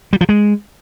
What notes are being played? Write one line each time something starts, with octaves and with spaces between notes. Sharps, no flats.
G3
F3
G#3